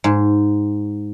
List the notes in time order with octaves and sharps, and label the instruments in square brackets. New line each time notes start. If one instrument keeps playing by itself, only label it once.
[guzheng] G#2